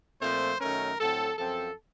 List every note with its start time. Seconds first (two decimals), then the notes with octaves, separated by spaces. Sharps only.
0.21 A#2 F3 A3 C4 C5
0.60 F#2 D#3 A3 C#4 A#4
0.99 A2 F#3 C4 A4
1.38 F#2 F3 C4 A4